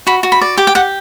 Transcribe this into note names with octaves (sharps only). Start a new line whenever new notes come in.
F#4 B5
F#4
B5
D5
G4 D6
G5
G4 F#5